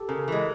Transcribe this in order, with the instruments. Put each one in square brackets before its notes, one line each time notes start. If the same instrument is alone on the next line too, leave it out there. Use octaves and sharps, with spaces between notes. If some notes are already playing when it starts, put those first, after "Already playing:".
Already playing: [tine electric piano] G4 A4
[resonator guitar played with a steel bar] C#3 [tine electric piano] G#4 A#4
[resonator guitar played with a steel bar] E3 G#3